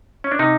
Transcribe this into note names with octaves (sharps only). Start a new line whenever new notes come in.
C#4
D4
C3 D#4